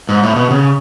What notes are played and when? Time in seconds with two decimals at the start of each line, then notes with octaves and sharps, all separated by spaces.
0.09 G#2
0.23 A2
0.36 B2
0.51 C#3